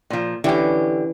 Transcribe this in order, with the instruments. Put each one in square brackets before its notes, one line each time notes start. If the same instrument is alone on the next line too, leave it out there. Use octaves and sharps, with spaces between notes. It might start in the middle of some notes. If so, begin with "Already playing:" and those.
[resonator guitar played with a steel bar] A#2 F3
[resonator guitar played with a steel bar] D3 G4 [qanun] E3 C#4